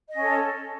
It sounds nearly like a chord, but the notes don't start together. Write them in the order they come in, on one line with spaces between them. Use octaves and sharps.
D#5 C#4 C#5 A4